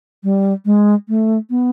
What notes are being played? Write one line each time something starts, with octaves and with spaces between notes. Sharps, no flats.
G3
G#3
A3
B3